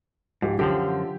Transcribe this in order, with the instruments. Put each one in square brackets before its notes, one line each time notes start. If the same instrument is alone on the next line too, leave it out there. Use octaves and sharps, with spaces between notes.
[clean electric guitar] G#2 [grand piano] F3 G4
[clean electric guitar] F#2 D3 F3 [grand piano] G4